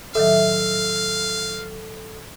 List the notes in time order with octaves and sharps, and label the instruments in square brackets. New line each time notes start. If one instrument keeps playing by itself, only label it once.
[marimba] A2 D#3 F#3 [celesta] A4 [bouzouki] E5 [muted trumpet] F5